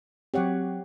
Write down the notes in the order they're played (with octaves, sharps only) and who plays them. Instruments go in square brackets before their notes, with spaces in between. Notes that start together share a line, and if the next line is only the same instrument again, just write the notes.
[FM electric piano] F#3 C4 [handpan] G4 C#5 F#5